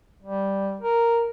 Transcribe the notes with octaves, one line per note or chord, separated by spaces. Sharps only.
G3
A#4